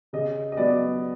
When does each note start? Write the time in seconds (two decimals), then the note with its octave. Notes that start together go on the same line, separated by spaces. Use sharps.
0.13 C#3 D#5
0.52 D#5
0.57 F#3 B3 D5